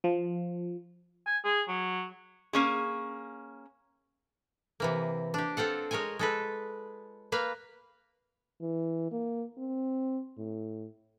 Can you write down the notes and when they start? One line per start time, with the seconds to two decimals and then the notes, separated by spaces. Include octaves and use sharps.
0.04 F3
1.27 G#5
1.44 G#4
1.68 F#3
2.53 A#3 C#4 G#4
4.80 C3 E3 A#3
5.34 D4 G4
5.57 C4 F4 A4 F#5
5.91 G#3 A#4 C#5 G5 G#5
6.19 G#3 A4 B4
7.32 A#3 B4 F5
8.61 E3
9.12 A#3
9.58 C4
10.38 A2